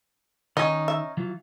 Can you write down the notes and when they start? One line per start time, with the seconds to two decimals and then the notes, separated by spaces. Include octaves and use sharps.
0.57 D#3 C#4 D#4 D#5
0.88 E5
1.17 E3 F#3 F4